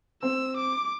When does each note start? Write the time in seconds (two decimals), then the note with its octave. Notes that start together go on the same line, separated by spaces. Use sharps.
0.23 C4 E6
0.57 D6